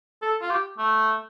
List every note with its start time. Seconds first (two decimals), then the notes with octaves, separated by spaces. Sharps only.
0.22 A4
0.42 F4
0.51 G4
0.78 A3